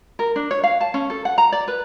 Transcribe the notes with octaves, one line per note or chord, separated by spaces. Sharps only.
A#4
D4
C#5
F5
A5
C#4
A4
F#5
A#5
D5
B4